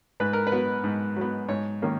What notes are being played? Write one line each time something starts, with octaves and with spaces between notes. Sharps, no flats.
G#2 B4
A#4
B4
F#3 B3
G#2
F#3 B3
G#2 C#5
D#3 A#3 C#4